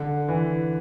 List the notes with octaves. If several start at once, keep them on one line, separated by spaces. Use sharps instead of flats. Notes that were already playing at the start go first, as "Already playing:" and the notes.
Already playing: D3
E3